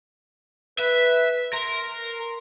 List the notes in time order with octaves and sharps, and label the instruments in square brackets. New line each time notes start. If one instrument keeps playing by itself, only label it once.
[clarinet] B4 [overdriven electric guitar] E5
[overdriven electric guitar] A#4 [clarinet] C6